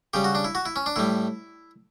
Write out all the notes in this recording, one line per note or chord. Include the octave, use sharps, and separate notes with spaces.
C#3 G3 G4
F#4
D4
E4
F#4
E4
C#4
D4
A2 G3 E4